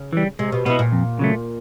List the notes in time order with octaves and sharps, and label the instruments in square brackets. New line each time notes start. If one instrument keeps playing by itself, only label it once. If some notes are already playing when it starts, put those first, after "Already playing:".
Already playing: [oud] C#3
[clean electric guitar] E3 G3
[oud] C3 [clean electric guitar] G#3
[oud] B2
[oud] B2 [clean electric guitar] B3 E4
[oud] A#2
[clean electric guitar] F2
C#3 F#3 A3